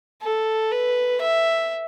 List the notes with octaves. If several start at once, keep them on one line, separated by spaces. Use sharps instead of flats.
A4
B4
E5